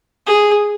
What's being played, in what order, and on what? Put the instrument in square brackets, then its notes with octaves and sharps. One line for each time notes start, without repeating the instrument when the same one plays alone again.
[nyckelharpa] G#4